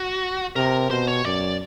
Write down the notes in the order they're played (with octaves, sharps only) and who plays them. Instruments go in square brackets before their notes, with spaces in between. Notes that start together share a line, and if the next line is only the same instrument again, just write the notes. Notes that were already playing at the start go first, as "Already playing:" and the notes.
Already playing: [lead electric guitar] F#4
[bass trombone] C3 [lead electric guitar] A#4
[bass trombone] B2 [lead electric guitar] C5
[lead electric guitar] C#5
[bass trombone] F#2 [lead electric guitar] D5